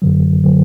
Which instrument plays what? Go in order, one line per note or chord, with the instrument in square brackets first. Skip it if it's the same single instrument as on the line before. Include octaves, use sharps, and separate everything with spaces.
[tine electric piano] F#2 D3 F#3
D3 F#3